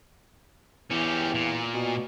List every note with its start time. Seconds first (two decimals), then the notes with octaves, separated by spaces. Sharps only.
0.90 E2 C#4 G4
1.34 A#2
1.74 B2